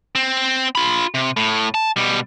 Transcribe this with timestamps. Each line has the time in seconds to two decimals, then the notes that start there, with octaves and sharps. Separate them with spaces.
0.15 C4
0.75 F4 B5
1.14 C3
1.37 A2
1.74 A5
1.96 B2 G3